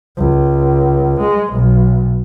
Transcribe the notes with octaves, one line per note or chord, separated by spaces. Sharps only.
C#2
G#3
B1